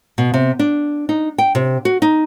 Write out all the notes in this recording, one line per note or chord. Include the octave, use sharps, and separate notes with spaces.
B2
C3
D4
D#4
G5
C3
F#4
D#4